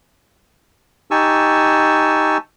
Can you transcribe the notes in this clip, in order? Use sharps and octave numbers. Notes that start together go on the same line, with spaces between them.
D#4 G4 G#5 A5 C#6 E6